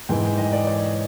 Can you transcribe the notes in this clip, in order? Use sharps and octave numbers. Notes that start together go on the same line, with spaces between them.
G#2 E3 G#3 G5
D#5
D5
C#5